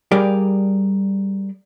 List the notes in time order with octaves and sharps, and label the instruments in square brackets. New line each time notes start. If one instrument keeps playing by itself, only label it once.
[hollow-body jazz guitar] G3 G4 G#4 A#4 D5 F5